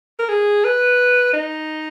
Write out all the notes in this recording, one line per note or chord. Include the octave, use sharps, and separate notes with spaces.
A#4
G#4
B4
D#4